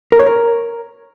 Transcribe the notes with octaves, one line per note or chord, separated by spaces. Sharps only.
A#4
C#5
A#4